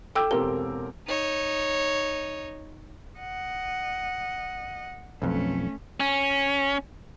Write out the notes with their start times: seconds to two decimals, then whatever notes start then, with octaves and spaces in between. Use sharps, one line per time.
0.15 A4 G5 D6 E6 G6
0.31 E1 C4 G4 A#4 G7
1.07 D#4 C#5
3.19 D#5 F#5
5.22 B1 F2 A3 C#4
6.00 C#4